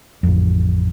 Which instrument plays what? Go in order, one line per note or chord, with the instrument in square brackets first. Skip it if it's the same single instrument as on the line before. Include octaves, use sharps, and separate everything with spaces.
[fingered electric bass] A1 F2